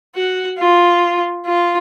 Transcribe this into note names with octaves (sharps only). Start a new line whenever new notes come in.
F#4
F4
F4